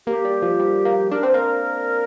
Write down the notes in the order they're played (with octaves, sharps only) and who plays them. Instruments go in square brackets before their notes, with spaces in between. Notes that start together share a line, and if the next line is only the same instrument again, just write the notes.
[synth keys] A#3 [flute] G4
[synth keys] G3
F3
G3
A#3
[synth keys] D4 [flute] A#4
[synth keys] C4 [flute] C5
[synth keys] A#3 [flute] A#4